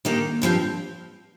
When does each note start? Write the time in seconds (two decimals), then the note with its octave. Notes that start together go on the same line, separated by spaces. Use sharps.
0.05 D#3 A#3 D#4 G4
0.42 G2 F3 C4 G4